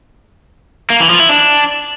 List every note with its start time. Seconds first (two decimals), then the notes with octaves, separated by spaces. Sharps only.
0.90 A#3
1.00 E3
1.10 F3
1.19 E4
1.29 D4